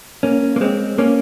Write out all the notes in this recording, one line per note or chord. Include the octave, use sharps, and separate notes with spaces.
A#3 C#4
A#3
G#3 C4
A#3 C#4